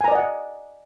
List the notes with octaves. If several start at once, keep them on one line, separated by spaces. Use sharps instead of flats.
D5 D#5 F#5 G#5 A#5